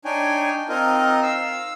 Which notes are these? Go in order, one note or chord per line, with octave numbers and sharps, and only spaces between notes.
D4 D#4 C#5 G5 G#5
C4 D#4 F4 A#4 D#5
F5 E6